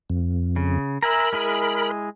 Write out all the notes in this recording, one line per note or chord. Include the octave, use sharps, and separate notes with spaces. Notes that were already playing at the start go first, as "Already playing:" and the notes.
F2
C#3
A#4 E5 G#5 A#5 B5
G#3 E4 G#4